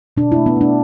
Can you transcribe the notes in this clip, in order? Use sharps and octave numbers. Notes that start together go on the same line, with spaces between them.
B2 D4
A3 E4
B3
A3 D4